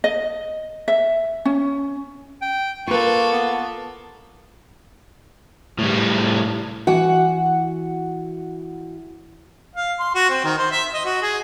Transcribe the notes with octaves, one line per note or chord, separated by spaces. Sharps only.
D#5
E5
C#4
G5
A#3 F4 A4 B4 C#6
B3
A2 G3
E3 F#4 F#5
F5
C6
F#4
C4
D#3
C5
E5
D#5
F#4
G#4